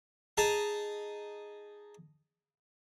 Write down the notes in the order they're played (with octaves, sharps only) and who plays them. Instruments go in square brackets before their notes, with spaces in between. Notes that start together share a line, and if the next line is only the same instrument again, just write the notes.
[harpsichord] D#4 G#4 A5 A#5